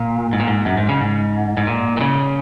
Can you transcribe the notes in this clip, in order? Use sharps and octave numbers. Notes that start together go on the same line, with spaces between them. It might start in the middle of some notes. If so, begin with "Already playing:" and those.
Already playing: A#2
G#2
A#2
G#2
F#2
G#2
C#3
G#2
G#2
A#2
A#2
C#3